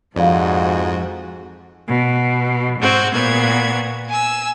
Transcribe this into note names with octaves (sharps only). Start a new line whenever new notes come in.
F2 G#2 F3 F#4 D5 F5
B2
G#2 C4 F#4 G#6
A#2 B3 F#4 G#6
G#5 E6